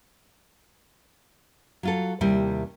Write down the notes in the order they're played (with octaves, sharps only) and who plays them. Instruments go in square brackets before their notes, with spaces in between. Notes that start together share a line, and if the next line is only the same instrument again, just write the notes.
[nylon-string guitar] F#3 F4 A4
D#2 C3 G3 E4